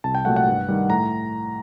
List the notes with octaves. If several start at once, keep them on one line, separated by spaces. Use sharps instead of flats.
C2 A5
G5
A#2 F#3 A3 F#5
F#5
G2
D#3 G3
A2 A#5